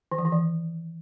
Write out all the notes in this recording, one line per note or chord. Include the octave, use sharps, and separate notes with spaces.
D#3
E3
D#3
E3